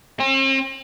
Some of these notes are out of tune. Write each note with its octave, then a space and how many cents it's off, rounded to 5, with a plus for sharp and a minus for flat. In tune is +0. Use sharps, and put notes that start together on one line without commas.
C4 +45